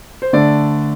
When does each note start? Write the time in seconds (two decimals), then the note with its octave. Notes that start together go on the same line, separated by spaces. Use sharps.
0.22 C5
0.33 D3 A3 D4 D5